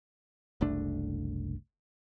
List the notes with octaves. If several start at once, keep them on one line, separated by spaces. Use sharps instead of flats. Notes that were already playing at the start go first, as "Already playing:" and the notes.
F#1 C2 A3 D4